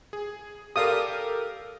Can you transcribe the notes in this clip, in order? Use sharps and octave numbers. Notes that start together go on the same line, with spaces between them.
G#4
G4 A4 A#4 D5 F5 D#6